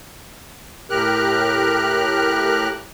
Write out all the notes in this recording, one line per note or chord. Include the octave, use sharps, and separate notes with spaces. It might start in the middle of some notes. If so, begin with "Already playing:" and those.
A2 G4 A#4 F6 F#6